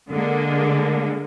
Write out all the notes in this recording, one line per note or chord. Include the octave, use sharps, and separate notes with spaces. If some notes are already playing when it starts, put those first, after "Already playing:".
D3 G#3 A#3